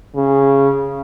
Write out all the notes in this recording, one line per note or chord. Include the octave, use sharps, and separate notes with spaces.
C#3